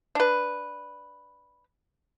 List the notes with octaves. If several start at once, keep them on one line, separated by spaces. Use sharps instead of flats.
D4 B4